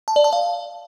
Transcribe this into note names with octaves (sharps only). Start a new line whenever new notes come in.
A5
D5
A5
F5